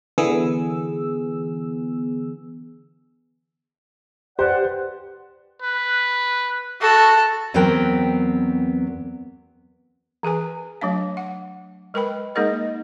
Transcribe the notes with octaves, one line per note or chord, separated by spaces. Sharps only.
D3 E3 B3 G#4 E6
G4 B4 C5 D5 F#5
B4
F#4 A4
E2 F#3 B3 C4 A#4 G5
E3 G#4 B4 G#5
F#3 A3 D4 F5
F#5
G#3 A#4 B4 G5 B5
G#3 A#3 D#4 G#4 A#4 D#5